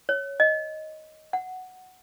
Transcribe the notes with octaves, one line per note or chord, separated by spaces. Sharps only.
C#5
D#5
F#5